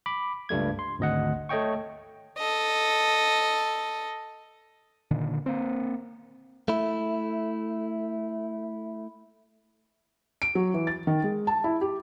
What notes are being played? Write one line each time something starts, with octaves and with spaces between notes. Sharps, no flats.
B5 D6
C#2 G2 G3 A3 G#6
C6
G#1 D2 D#5 F#5
A3 C#5 D#5 G5 C#6
A4 D#5
A#2 D3 D#3
A#3 C4
A3 E4
D7
F#3
E3
A6
D#3
G#3
A5
E4
G4